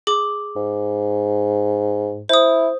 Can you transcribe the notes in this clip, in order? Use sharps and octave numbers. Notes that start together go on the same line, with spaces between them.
G#4 D6
G#2
E4 C5 D#6